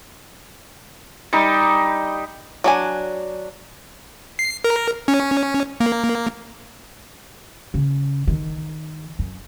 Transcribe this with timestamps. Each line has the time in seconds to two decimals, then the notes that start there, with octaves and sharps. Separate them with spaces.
1.33 G3 D#4
2.64 F#3 D4 G#5
4.39 C7
4.64 A#4
5.08 C#4
5.80 A#3
7.74 C#3
8.27 D#3
9.19 F#2